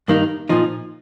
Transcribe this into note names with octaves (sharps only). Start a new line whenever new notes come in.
G2 D#3 A#3 D#4
A#2 F3 D#4